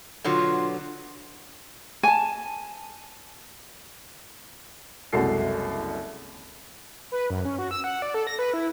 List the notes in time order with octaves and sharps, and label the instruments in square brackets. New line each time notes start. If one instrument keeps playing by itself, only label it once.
[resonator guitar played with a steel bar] B2 D3 F#3 [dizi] F4
[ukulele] G#5 A5
[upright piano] F#1 C2 G#3 F#4 A4 C7
[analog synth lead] B4
F#2
C#4
F#4
E6
F#5
D5
A4
A#6
B4
E4